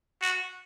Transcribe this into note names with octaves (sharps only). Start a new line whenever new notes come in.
F#4